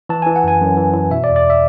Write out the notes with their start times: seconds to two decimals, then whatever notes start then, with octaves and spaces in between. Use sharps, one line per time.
0.09 E3 A5
0.22 E3 G#5
0.36 F#5
0.44 F#2 G#5
0.61 F#2
0.77 E3
0.94 E3
1.11 B2 E5
1.24 D5
1.29 E2
1.36 D5
1.50 E5